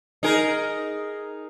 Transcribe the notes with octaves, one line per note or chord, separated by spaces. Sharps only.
D#4 G#4 A#4